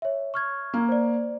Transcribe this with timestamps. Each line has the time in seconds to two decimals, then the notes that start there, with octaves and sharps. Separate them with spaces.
0.02 C#5 E5
0.34 C#6 F6 G#6
0.74 A#3
0.89 C5 D5